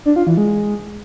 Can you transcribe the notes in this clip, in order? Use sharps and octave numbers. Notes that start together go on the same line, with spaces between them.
D4
F4
E3
G#3